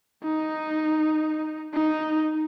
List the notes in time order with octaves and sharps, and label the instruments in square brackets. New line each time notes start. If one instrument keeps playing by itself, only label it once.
[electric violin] D#4
D#4